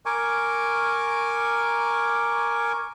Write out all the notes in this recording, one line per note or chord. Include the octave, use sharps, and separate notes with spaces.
A#4 G#5 C#6 D6